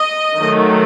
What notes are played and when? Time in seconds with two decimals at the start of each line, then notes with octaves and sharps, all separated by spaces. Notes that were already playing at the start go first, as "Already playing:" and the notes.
Already playing: D#5
0.38 D#3 F#3 A3